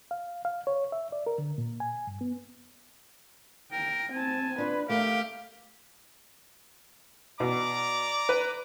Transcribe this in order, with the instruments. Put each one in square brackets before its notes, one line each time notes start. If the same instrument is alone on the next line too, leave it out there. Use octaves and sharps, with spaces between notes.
[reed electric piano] F5
F5
C#5
E5
D5
A#4
D3
A#2
G#5
G2
B3
[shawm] A#4 [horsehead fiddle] G5
[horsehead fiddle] C4 A5 [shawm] G#5
[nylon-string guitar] D4 F4 [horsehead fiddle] B4
[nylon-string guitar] A3 A#4 [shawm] G4 [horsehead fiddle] F5
[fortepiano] B2 [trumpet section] D5 A#5 D6
[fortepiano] B4